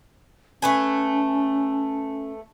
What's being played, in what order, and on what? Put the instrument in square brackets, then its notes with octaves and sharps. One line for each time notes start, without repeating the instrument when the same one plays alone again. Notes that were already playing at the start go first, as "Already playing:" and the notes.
[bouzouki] A3 B4 G#5 [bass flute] C#4